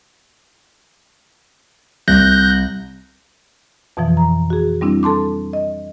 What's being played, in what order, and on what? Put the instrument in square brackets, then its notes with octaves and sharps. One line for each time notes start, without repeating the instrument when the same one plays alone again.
[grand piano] C2 [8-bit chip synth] F#6 G6 A#6
[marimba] F2 B2 E3 F3
A#5
F#4 G#4
G3 C4 D4 E4
A4 A5 C6 D6
D#5